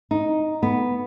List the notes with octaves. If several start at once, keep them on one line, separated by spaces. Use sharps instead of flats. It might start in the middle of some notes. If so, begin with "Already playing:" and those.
D#4
B3